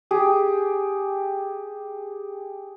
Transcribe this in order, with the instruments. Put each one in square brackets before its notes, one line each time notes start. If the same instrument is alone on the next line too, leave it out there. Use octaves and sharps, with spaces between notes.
[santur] G4 G#4